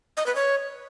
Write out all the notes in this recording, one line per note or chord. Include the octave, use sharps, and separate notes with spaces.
D#5
B4
C#5